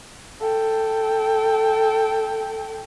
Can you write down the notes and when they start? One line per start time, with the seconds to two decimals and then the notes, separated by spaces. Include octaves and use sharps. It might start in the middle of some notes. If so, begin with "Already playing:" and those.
0.41 A4 G5